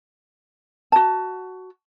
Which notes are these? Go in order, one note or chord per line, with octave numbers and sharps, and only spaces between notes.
F#4 A5